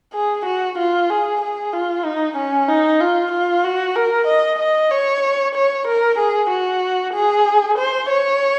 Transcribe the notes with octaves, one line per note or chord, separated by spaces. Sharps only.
G#4
F#4
F4
G#4
G#4
F4
D#4
C#4
D#4
F4
F4
F#4
A#4
D#5
D#5
C#5
C#5
A#4
G#4
F#4
G#4
C5
C#5